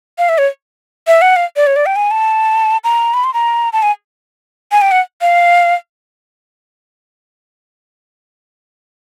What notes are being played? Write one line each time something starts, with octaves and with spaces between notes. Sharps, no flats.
F5
E5
C#5
E5
F#5
F5
D5
C#5
D5
G5
G#5
A5
A#5
B5
C6
A#5
A5
G#5
G#5
G5
F#5
F5